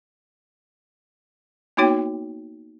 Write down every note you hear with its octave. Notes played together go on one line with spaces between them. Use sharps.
A#3 B3 D#4 F#4 C#5 G5